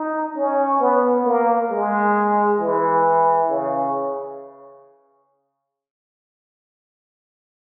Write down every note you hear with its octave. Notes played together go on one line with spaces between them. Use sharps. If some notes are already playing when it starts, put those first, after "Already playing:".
Already playing: D#4
C#4
B3
A#3
G#3
E3
C#3